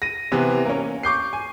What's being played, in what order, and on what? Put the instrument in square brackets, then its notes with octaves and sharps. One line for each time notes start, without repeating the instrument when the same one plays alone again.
[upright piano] A#6 D#7
C3 E3 B3 C4
A#3 C#4
C#6 D6 G6 C7
G#5